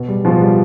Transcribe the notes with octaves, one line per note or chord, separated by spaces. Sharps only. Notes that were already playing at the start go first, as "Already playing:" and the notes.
Already playing: B2
G3
B2 F3
G3